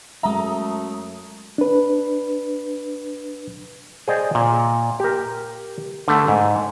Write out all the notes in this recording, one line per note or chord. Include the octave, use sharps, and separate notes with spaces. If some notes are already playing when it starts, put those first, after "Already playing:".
F#2 G#3 A3 E5 A#5 D#6
D4 B4
G#4 C5 D5 D#5 G5
A#2
G4 A#4
D3 A3
G#2